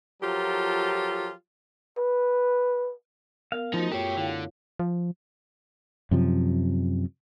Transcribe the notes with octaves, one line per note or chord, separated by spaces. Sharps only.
F3 F#3 F4 G4 A4 A#4
B4
B3 A#4 F5
F3 A3 D#4 F#4
F#2 F4 G4 A4 C#5
D3 E4 C#5 F5
F3
F#2 C3 F3